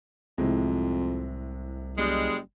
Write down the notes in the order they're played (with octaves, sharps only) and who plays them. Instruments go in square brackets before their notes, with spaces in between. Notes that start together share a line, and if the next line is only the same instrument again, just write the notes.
[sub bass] C2 [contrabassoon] F2 [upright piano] A2 C3 G#3
[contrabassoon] F#1 [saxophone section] G3 G#3